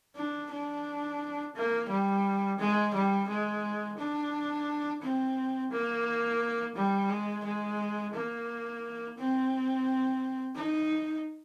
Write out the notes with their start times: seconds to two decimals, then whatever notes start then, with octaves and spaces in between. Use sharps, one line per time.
0.16 D4
0.51 D4
1.56 A#3
1.89 G3
2.59 G#3
2.94 G3
3.28 G#3
3.98 D4
5.02 C4
5.71 A#3
6.75 G3
7.09 G#3
7.44 G#3
8.14 A#3
9.18 C4
10.56 D#4